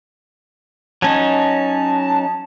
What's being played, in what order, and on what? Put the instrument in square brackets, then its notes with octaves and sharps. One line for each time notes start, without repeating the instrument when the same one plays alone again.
[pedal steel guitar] F#3 C#4 D#4 [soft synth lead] A5